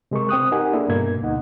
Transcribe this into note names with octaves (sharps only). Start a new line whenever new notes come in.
C3 G#3 A#4 C#6
C4 G5 D#6 F#6
D#4 G4 A#4 F#5 G#5
A#3 D4 E4 G#4 A4
G2 B2 A#3 G#6
D2 B2 D#4 F#5